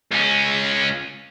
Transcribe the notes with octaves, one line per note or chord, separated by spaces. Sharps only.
C#2 C#4